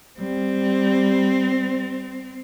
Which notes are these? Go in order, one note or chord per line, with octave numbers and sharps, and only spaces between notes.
G3 C4